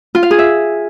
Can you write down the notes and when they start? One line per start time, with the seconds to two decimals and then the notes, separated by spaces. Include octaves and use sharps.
0.15 F4
0.23 F5
0.31 G#4
0.39 E5